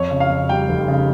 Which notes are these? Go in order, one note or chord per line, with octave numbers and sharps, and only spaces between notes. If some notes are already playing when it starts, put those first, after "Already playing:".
Already playing: F2 C#5
C#3
F5
F2
G3 G5
F1
C#3